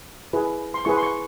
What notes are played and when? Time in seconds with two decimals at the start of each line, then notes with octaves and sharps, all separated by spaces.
0.33 E4 G#4 B4
0.74 C6
0.85 E4 G#4 B4 C#6
0.97 C6
1.03 C#6